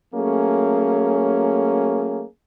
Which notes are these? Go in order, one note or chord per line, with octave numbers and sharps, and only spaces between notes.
F#3 A3 A#3 C#4 G#4